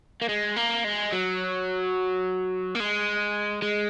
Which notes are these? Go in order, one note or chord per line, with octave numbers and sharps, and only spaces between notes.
A#3
G#3
A#3
G#3
F#3
A#3
G#3
G#3